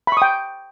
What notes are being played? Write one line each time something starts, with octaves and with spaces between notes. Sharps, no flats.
G5 B5 C#6 D#6